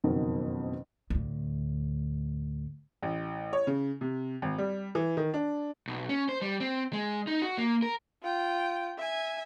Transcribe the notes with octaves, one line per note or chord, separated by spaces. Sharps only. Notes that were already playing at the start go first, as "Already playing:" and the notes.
F#1 F2 B2 D#3 F#3 A#4
D2 A2
A1
C#5
C#3
C3
G#1
G3
E3
D#3
D4
B1
C#4
C5
G3
C4
G#3
D#4
F#4
A#3
A#4
F4 G5
E5 G#5